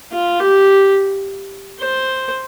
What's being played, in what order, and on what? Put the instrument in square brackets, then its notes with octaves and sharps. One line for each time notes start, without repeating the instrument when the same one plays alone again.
[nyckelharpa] F4
G4
C5